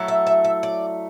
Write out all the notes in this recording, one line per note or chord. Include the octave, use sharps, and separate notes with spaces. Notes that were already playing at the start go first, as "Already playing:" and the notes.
Already playing: F#3 A3 E4
E5
E5
E5
D5